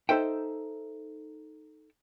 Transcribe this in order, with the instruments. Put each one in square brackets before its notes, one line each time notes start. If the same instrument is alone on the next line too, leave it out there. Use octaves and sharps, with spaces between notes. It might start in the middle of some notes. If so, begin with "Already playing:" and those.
[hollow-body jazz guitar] D#4 A4 C5 E5 G5